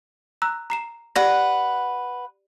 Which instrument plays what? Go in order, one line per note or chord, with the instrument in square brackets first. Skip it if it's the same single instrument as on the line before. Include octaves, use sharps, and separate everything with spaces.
[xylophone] A#5 E6 F#6
A#5 C7 E7
[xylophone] G4 D5 A#6 [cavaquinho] B4 F#5